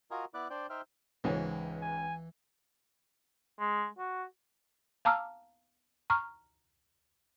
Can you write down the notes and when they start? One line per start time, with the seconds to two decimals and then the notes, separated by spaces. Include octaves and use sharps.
0.11 F4 F#4 A#4 D#5 G#5 A#5
0.34 B3 E4 D5 D6 F#6
0.50 D4 C5 D5 G5
0.70 D#4 C5 E5 G5 F6
1.24 C#2 G#2 E3 G#3 C#4
1.82 G#5
3.59 G#3
3.98 F#4
5.05 F5 A5 A#5 D6 E6 F6
6.10 A#5 C#6 F6